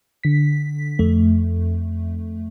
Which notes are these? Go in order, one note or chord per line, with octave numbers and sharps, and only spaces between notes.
D3 B6
F2 A3